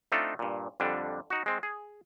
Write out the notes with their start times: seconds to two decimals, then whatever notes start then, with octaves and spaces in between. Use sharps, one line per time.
0.12 A3 C4 D4 D#4 F4 A4
0.39 G2 A#2
0.80 F2 D3 G3 D4
1.30 D#4 F#4
1.46 G#3 C4
1.63 G#4